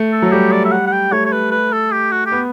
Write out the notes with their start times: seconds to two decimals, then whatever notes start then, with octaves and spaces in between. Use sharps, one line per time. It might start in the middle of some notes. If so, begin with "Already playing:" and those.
Already playing: A3
0.12 A4
0.22 F#3
0.32 G3 G4
0.53 D5
0.65 E5
0.72 F#5
0.86 F#5
0.92 G5
1.12 A3 C#5
1.25 C#5
1.32 B4
1.51 B4
1.73 A4
1.92 G4
2.12 F#4
2.26 G4
2.32 B3